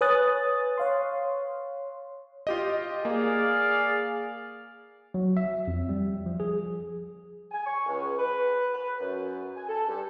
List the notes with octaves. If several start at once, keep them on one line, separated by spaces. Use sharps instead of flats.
B4 C#5 G#5 D#6 F#6 A6
C#5 F5 C6
F4 G4 D#5
A#3 G#4 D5 F5
F#3
E5
F2
G3
F3
G#4
G#5
C#6
C#2
B4
B4
F#2
G#5
A4
G2